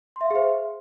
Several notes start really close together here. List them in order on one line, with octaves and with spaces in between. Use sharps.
C6 E5 F5 G#4 C5